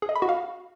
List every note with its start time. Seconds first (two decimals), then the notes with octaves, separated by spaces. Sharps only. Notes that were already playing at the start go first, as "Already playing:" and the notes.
0.02 G#4
0.09 D#5
0.16 B5
0.22 F#4
0.29 F5